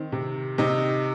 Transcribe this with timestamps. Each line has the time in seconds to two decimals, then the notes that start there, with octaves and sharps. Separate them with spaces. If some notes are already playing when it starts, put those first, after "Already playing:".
Already playing: D#3 C4
0.12 C3
0.58 C3 D#4